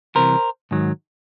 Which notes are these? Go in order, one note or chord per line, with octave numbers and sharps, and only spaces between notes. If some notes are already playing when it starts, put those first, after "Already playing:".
C2 C3 E3 A#4 C5
G#2 D#3 F#3